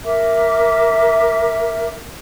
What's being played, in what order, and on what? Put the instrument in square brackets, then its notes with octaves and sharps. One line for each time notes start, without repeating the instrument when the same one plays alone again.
[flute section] A#4 E5 D6